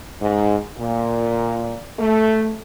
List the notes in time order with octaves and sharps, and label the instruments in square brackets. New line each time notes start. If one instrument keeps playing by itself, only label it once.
[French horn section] G#2
A#2
A3